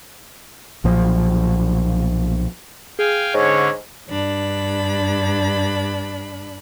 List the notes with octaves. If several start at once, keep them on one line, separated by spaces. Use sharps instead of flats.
B1 A#2 F3
G#4 F5 G5 G#5
G#2 D3 C#4 C#5
G2 D4 B5